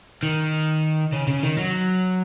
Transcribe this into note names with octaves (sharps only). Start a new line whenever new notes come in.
D#3
C#3
C#3
D#3
F#3